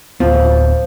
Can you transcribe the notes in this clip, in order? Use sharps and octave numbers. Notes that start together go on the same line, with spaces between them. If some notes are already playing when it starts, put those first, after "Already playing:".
D1 F3 B3